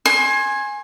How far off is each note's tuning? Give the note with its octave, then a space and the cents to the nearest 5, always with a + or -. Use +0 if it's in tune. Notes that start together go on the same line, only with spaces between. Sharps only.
G#5 +0 C6 +35